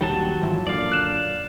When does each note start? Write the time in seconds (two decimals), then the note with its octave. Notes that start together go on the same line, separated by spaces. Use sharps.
0.01 D#1 A#1 D#3 F#3 G3 A5
0.41 G#2 E3 F3
0.67 F#2 A#2 D3 D5 F5
0.92 F#6 E7